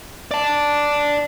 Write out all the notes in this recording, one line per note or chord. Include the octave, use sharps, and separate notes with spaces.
D5 A5